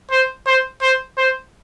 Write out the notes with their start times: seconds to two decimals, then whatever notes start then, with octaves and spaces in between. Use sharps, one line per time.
0.11 C5
0.47 C5
0.82 C5
1.18 C5